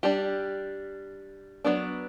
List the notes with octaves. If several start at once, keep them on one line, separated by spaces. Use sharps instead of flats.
G3 D4 G4
F#3 B3 D4